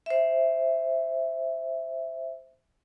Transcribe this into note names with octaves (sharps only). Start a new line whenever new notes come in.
C5 E5